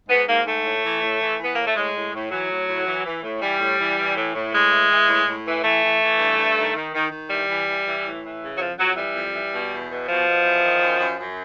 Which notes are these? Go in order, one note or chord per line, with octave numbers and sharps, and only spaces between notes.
G#2 B3
G#2 A#3
G#2 A3
A2
E3
A2
E3
E3
B3
A2 A#3
A3
A2 G#3
A2
A2
E3 F#3
A2
A2
E3
E3
A2
E3 G3
A2
E3
E3
A2
A2
A2 G#3
E3
E3
A2
A2
E3
E3 A3
E3
E3
G2
G2
D#3
D#3
D#3
D#3
E3 G3
E3
E3
E3
A2
E3
C#3
F#3
F2 F3
F2 F#3
E3 G3
F2
E3
B2
E2
B2
B2 F3
B2
E2
D#3
F#2
F#2
F#2